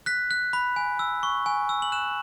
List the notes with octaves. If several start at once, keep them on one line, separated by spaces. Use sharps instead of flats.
F#6 B6
F#6
B5
G#5
E6
C#6
G#5
E6
F#7
F#6 E7